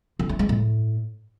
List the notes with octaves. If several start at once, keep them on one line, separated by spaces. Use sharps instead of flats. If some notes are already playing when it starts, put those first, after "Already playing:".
D3
A3
G#3
A2